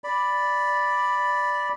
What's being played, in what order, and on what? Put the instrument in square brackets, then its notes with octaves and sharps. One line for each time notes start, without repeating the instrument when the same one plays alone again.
[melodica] D5 B5